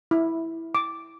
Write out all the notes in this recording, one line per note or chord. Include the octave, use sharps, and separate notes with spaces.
E4
D6